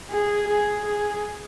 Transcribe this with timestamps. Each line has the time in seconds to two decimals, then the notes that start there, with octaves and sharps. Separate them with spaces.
0.11 G#4
0.48 G#4
0.86 G#4